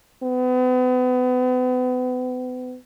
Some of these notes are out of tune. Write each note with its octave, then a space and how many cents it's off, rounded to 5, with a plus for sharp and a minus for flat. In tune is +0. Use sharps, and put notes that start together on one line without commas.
B3 +35